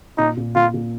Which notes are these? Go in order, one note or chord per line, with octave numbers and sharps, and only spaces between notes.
A#2 D#4
A#2
A#2 F4
A#2